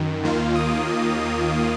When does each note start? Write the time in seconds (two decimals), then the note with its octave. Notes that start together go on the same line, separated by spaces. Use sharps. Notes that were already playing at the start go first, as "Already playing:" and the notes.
Already playing: F#2 D#3
0.23 D#2 D#3 A#3 F4
0.55 D#6